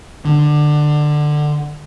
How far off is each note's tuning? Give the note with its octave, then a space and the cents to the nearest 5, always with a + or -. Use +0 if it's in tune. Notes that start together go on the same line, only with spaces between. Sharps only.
D3 +20